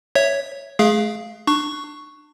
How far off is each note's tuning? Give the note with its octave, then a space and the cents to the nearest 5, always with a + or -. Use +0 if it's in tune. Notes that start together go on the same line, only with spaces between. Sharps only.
C#5 +0 E5 +0
A3 -45 G#4 +5 F5 +0
D4 +30 C#6 +0